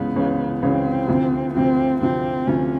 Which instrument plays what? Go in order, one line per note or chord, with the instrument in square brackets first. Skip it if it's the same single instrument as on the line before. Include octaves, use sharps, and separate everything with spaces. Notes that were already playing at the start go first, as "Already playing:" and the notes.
Already playing: [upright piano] C#2 C#3 E3 G#3 C#4 [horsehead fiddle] B3
[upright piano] C#2 C#3 E3 G#3 C#4
[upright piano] C#2 C#3 E3 G#3 C#4 [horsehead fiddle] C4
[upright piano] D2 C3 F3
[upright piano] D2 C3 F3 [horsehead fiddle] C4
[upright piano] D2 C3 F3 [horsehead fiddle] C4
[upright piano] D2 C3 F3 [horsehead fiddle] C#4